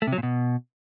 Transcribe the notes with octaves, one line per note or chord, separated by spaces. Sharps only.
A3
C3
F#3
A#2
B2